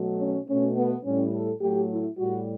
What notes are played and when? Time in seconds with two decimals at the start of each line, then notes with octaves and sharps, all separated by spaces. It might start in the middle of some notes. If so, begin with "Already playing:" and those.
Already playing: B2 F#3 A3
0.19 C#4
0.48 B2 A3 C#4
0.76 B3
1.04 A2 G3 C#4
1.33 A4
1.61 A2 F#3 A3 G4
1.89 E4
2.18 A2 G3 F#4